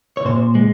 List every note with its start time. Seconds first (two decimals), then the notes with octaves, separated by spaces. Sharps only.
0.17 C#5
0.25 A#2 C5
0.55 G#3